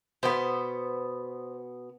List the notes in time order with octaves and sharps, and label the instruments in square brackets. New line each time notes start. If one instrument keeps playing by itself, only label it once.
[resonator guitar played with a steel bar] B2 B3 [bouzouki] C5